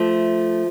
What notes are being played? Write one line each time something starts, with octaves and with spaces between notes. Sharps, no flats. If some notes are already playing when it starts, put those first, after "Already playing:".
Already playing: F3 A3